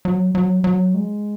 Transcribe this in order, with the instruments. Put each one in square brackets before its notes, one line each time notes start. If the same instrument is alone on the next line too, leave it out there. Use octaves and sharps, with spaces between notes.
[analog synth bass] F#3
F#3
F#3
G#3